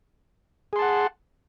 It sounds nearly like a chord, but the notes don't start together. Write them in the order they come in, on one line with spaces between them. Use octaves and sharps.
G#4 C6 A5 F#5